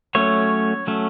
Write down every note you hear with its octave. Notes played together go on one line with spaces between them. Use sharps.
F#3 A3 C#4 C#5
F#3 A3 C#4